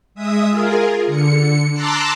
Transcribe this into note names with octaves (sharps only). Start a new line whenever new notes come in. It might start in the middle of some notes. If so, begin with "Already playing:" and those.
G#3 E5 D#6
F4 G#4 A#4
D3 C#7
A5 A#5 C6 D6 E6 F#6